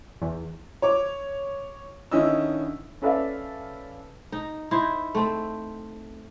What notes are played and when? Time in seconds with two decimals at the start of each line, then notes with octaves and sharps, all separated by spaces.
0.22 E2
0.82 C#5 D6
2.11 D3 D#3 C#4 E4 D#5 E6
3.02 C#4 A4 B4 D5 E5 F5
4.32 D#4
4.71 D#4 E4 C5
5.15 A3 C4